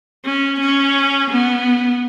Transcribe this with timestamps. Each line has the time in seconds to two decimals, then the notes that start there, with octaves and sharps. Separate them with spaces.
0.25 C#4
0.60 C#4
1.30 B3